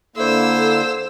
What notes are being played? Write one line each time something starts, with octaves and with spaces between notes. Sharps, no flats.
D3 A#3 E4 A4 C5 E6